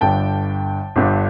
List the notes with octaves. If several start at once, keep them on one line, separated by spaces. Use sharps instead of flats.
G1 G2 D3 G5 A5
G1 G2 D3